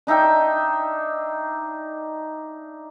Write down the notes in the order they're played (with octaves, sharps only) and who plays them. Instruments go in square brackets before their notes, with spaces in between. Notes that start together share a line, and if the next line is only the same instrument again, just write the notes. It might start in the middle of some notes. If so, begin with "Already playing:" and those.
[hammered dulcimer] D4 D#4 E5 G5